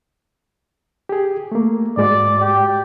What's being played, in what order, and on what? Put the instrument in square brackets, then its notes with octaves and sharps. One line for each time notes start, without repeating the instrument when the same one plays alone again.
[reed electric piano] G4 G#4
A3 A#3
[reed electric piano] G#2 G#3 F#4 [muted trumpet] D5
[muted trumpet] G4